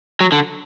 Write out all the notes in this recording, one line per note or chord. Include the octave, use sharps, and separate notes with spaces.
F#3
D3